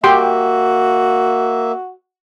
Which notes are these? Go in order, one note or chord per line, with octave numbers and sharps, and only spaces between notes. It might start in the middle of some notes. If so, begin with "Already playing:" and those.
A#3 F#4 G4 E5 G5 C6